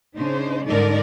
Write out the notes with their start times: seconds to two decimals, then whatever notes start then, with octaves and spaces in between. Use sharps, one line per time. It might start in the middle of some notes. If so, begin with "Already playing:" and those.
0.18 C#3 D4 D#4 C5
0.67 G#2 D3 G3 D#4 A#4 D5